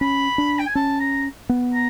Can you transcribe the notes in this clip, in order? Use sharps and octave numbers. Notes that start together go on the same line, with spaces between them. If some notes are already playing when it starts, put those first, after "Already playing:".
C#4 B5
D4
G5
G#5
C#4 A5
A#5
B3
A#5